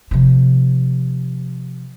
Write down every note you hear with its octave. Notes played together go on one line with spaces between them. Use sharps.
C3 F3